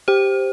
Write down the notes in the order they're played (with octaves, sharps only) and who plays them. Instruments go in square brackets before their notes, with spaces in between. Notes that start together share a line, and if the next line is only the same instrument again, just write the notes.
[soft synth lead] G4 [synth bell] C5